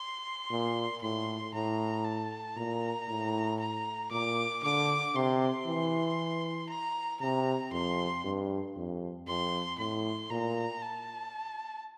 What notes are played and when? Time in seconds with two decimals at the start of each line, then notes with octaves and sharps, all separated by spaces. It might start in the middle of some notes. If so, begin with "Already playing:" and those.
Already playing: C6
0.51 A#2
1.02 A2 C6
1.54 A2 A#5
2.05 A5
2.57 A#2 A#5
3.08 A2
3.60 A#5
4.11 A#2 D6
4.63 D3 D6
5.15 C3 C6
5.66 E3
6.69 A#5
7.20 C3 A#5
7.72 F2 C6
8.24 G2
8.76 F2
9.27 F2 C6
9.79 A2 C6
10.30 A#2 A#5
10.82 A5